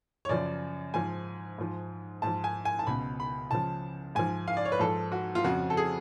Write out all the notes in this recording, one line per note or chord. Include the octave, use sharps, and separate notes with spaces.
C#5
F#2 C#3 F3 D5
G#2 F3 G#5
G#2 F3
G#2 F3 A5
G#5
G#5
A5
C#2 B2 B5
B5
C#2 C#3 F3 A5
G#2 F3 G#5
F5
D5
C#5
B4
G#2 F3 A4
F#4
F4
F2 C#3 F3 F#4
A4
G#4